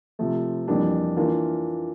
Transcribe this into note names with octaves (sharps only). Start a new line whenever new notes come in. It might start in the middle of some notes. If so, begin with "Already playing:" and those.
C3 F3 A3
F2 E3 G3 A#3 D4
E3 A#3 D4 F4 A#4